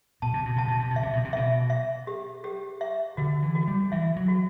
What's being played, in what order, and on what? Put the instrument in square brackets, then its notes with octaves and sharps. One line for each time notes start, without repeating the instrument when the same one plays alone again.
[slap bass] B2 [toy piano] A5
[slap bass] C3
B2
[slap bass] C3 [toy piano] A5
[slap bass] B2
C3
B2
[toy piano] E5
[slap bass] C3
B2
C3
[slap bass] B2 [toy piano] E5
[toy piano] E5
G4
G4
E5
[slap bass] D3 [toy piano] F#4
[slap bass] E3
[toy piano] F#4
[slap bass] G3
[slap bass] E3 [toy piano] E5
[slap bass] F#3
[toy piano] F#4